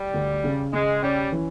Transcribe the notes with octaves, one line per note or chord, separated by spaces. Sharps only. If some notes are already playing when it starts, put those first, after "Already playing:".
Already playing: G3
D2
C#3
C#3 G#3
G3 C#4
E3